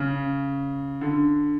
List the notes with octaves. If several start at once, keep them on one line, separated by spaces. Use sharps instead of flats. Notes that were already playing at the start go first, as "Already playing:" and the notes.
Already playing: C#3
D3